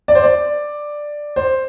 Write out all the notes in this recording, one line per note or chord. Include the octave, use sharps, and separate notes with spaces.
D5
C5
D5
C5